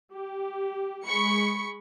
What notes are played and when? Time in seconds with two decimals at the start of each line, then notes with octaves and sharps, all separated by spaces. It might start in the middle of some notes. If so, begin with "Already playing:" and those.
0.11 G4
1.06 G#3 B5 C#6 C#7